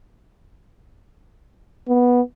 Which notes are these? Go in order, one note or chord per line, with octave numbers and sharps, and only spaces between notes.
B3